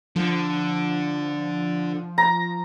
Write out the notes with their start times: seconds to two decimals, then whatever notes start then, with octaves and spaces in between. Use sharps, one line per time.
0.16 D3 F3
2.18 A#5